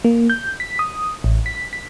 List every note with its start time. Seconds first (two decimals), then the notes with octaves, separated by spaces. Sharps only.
0.05 A#3
0.30 G6
0.60 B6
0.79 D#6
1.24 A1
1.46 B6
1.73 B6